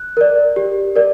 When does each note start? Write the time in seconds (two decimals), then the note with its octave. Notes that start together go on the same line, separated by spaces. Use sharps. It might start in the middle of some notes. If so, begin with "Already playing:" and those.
Already playing: F#6
0.17 A#4 D5
0.56 G4
0.96 A#4 D5